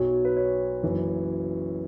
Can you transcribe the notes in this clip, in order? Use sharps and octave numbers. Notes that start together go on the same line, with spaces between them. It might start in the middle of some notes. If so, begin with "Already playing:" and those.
Already playing: B1 B2 F#3 C#5
B4
C#5
F#1 F#2 E3